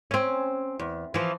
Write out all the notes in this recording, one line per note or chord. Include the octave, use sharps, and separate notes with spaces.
C4 C#4
E2
E3 F3